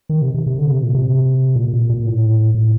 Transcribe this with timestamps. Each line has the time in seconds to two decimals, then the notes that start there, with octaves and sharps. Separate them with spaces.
0.09 D#3
0.22 C3
0.34 C3
0.46 C3
0.59 D3
0.71 C3
0.83 A#2
0.95 C3
1.56 A#2
1.73 A#2
1.89 A#2
2.06 A2
2.55 A2